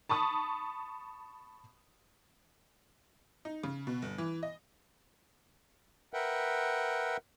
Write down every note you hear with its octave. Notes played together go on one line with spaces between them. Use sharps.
A5 B5 C#6 D#6
D#4
C#3
B2
G1
E3
D#5
A#4 B4 E5 F#5 G5